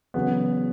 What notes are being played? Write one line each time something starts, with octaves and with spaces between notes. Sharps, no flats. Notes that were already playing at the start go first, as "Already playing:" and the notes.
E2 C#3 F#3 B3